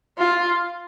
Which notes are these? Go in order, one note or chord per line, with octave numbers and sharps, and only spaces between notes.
F4